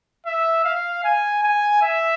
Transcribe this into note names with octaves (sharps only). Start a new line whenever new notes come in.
E5
F5
G#5
G#5
E5